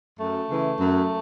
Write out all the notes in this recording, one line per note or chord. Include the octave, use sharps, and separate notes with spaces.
F#2 A3
C#3 E3
F#2